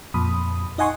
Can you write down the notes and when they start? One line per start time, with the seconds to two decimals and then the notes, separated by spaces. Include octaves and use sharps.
0.14 F2 A#2 B5 D#6
0.78 D#4 D#5 F#5 G#5 C6 C#6